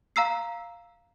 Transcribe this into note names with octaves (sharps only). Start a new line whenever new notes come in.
F5 A#5 E6 C7